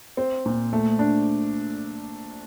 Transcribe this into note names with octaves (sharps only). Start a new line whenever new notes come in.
C4
A#2
A3
D4